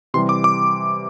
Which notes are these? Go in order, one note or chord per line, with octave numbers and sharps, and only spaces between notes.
C3 E3 G3 C6
D6
D6